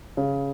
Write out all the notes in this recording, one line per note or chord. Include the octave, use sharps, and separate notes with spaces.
C#3